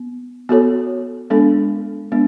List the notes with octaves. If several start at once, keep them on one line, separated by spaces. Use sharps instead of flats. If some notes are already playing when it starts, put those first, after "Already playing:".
Already playing: B3
B3 F#4 A4 C#5
G#3 B3 D4 A4
G#3 B3 D4